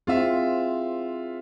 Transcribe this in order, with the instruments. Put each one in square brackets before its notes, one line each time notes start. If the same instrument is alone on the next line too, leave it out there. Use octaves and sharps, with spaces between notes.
[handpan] C4 E4 G#4 [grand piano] F4 E5